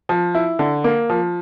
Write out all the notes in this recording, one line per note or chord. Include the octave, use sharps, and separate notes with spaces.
F3
E4
D3
A#3
F3